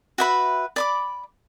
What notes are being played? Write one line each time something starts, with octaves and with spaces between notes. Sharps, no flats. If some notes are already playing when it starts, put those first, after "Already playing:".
F#4 B4 E5 B5
D5 B5 D6